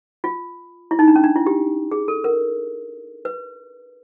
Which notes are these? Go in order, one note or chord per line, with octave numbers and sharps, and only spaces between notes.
F4
E4
D#4
D4
C#4
D4
E4
G4
G#4
A4
A#4
B4